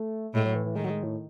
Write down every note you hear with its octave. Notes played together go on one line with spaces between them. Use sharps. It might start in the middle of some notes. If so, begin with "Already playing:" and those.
Already playing: A3
A2 G#3
F#3
E3
E3
D#3 G#3
F#3
G#3
A2